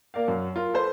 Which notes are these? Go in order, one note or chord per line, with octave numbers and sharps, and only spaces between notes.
A#3 A#4 D5 F5
F#2
F4 A#4
A4 B4 C5